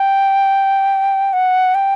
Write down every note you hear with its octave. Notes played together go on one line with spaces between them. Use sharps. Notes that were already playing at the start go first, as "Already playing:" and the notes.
Already playing: G5
F#5
G5